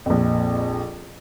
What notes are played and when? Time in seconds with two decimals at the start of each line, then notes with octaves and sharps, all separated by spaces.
0.06 A#1 F2